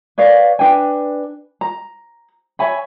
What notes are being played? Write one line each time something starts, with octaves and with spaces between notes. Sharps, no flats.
B4 C#5 D5 F5
D4 B4 G5 G#5
A#5
C#5 E5 G#5 B5